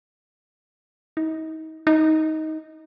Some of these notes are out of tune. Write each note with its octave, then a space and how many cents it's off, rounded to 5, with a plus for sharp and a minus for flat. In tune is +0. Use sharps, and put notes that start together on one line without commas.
D#4 +35
D#4 +15